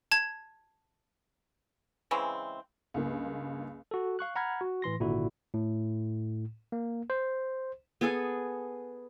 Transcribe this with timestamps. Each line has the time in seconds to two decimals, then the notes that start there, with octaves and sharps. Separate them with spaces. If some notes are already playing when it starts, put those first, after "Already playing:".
0.12 A5 G#6
2.11 C#3 E3 G#3 C4
2.94 C#2 G2 A#3
3.91 F#4 A4
4.19 F5 C#6 F#6
4.36 F#5 A#5 B5 F6 G#6
4.61 F#4
4.82 A2 E3 C6 A#6
5.00 G#1 A#2 D3 E4 F#4
5.54 A2
6.72 A#3
7.10 C5
8.01 B3 G#4 A4 G#5